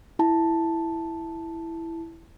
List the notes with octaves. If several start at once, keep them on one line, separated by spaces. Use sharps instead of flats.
E4 A5